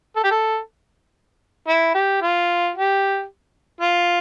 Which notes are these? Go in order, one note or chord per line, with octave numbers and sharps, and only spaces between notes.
A4
G4
A4
E4
G4
F4
G4
F4